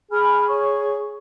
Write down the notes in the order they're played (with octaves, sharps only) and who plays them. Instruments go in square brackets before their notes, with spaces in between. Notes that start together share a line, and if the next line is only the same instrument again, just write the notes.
[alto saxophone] G#4 [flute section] G#5 B5 F6
[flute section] C#5 C#6